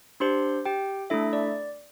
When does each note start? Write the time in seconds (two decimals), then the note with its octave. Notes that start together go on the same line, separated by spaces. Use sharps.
0.20 D4 G4 C5 C6
0.66 G4 G5
1.10 A3 D4 E4 A4 E5
1.33 D5